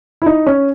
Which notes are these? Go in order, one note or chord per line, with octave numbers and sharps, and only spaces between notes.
E4
D#4
C#4